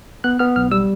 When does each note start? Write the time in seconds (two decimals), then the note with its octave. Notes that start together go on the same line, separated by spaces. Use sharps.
0.24 B3 F#6
0.39 B3 F6
0.56 B1 F6
0.71 G3 E6